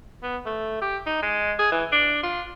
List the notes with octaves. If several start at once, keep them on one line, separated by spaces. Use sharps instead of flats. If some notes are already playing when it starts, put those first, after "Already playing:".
B3
A3
G4
D#4
G#3
G#4
E3
D4
F4